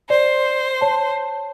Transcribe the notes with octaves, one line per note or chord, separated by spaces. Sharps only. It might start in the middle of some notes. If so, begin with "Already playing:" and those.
C5 D5
C#5 A5